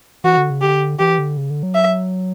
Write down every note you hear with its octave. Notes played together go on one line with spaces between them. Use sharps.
E3 F#4
D3
C#3
D3 G4
E3 G4
D3
C#3
D3
F#3
E5